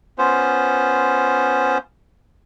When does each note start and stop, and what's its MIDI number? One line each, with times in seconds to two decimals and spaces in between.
0.18 1.78 59
0.18 1.78 61
0.18 1.78 65
0.18 1.78 72